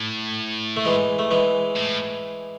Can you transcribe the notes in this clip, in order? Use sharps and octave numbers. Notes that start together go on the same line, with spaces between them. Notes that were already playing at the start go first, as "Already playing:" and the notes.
Already playing: A2
A3
E3 G#3
A3
E3 G#3
A2